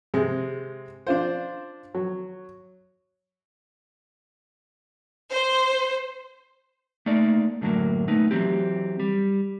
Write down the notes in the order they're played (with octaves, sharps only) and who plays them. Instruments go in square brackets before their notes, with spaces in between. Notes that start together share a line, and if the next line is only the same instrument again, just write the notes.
[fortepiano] C3 G#3
D4 F4 C5
F#3
[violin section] C5
[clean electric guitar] A3 A#3 D#4 D5
F#2 A2 D3 F#3 A#3
A3 B3 D#4
E3 F#3 C4 G4
G3